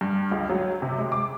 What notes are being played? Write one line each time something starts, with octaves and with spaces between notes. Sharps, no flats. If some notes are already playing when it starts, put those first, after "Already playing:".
G2
C#2
F#3
C3
G#3
D6